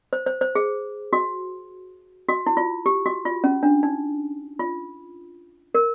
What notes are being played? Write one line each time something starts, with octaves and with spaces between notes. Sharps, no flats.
C5
C5
C5
G#4
F#4
F#4
E4
F4
G4
F#4
F4
C#4
D4
D#4
F4
A#4